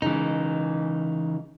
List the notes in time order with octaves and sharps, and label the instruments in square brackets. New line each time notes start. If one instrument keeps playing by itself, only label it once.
[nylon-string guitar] C#3 G#3 [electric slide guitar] E3 D#4